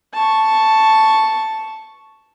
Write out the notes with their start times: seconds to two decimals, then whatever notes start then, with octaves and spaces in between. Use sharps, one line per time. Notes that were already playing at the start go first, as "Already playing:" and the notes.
0.14 A5 C#6